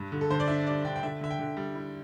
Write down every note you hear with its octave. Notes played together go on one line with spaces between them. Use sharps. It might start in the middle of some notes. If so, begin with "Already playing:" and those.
Already playing: G2
D3
A4
D3 C5
D5
D4 E5
G2 D5
D3 G5
G5
D3 E5
D3 E5
G5
D3
G3
E4